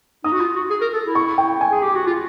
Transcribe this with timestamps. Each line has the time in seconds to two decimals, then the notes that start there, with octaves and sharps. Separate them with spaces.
0.24 D#4 D#6
0.32 F#4
0.40 F4
0.55 F#4
0.70 G#4
0.81 A#4
0.93 A4
1.04 E4
1.15 C#6
1.38 G5
1.61 G#5
1.71 G#4
1.83 G4
1.95 F#4
2.06 F4